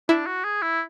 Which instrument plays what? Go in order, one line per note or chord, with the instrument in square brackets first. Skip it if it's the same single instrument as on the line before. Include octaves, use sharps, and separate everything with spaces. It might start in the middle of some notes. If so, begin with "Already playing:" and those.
[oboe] D4 [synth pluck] E4
[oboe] F#4
G#4
E4